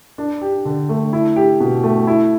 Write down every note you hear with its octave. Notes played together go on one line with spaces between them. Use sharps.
D4
G4
D3
A3
E4
G4
B2
A3
E4